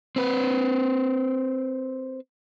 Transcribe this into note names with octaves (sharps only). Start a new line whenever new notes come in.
C4 B4